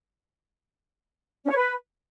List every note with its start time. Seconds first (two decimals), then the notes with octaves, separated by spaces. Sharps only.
1.44 C#4
1.50 C#5
1.55 B4